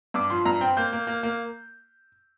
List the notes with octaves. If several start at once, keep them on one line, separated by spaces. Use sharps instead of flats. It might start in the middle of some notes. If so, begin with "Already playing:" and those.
G2 D6
F3 C6
G2 A#5
C4 G5
A#3 G6
A#3
A#3
A#3